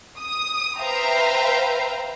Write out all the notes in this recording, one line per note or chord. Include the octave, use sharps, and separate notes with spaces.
D#6
B4 C5 E5 F5 G5 A#5